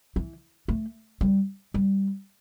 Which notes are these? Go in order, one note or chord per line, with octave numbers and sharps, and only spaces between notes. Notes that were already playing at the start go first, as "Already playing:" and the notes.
E3
A3
G3
G3